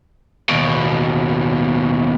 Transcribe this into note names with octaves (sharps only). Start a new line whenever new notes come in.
D#2 B2